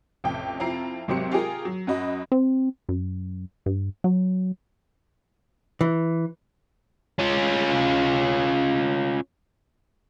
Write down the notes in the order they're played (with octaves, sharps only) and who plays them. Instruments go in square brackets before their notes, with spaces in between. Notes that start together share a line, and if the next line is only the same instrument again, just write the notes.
[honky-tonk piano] A1 F2 C3 G5
F2 C4 E4 F4 A#5 C7
G#1 C3 F#3 G4 C5 C#7
F4 G4 G#4 A#4
F#3
F#2 F#4 D#5 B5
[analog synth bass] C4
F#2
G2
F#3
[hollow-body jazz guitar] E3
[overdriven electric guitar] C#4 F4